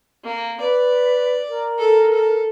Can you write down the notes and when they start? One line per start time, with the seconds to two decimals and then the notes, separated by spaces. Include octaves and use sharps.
0.24 A#3
0.60 B4 D5
1.49 A#4
1.78 A4
2.13 A4